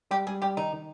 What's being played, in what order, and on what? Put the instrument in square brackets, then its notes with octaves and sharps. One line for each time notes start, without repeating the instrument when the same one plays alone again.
[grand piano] G3 [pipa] G4
[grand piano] G3 [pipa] G#4
[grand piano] G3 [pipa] G4
[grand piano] D#3 [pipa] D#4
[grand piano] D#3